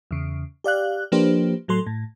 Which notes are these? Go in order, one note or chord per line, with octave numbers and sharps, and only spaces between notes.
E2 C#3
G4 D5 F5 F#6
F3 A#3 D4 G4 B4 C5
A2 F#3 A4 C6
A2